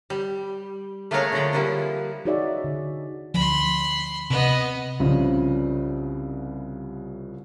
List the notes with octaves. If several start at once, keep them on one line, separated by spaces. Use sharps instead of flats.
G3
A3 A#3 D4 G#4 A#4 C#5
D3 F3 F#3 F#4 F#5 G5
D3 F3 G3 A#3 E4
D#4 F#4 G#4 C#5 D5 E5
D3
D2 F3 B5 C6
C3 B3 D#5
C2 C#3 F3